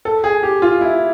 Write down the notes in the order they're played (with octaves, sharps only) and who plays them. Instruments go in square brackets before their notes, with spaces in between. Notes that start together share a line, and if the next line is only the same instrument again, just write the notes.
[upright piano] A4
G#4
G4
F4
E4